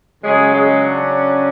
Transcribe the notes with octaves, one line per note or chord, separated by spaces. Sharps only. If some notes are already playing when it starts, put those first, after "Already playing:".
C#3 F#3 G#3 C#4 G#4
G#3 G#4
D4